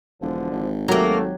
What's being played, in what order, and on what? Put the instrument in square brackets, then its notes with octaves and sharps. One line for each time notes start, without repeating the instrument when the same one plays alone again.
[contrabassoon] E1 [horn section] D3 F3
[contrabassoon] G#1
[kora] F#3 G4 [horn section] A3 [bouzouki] A#3 A#4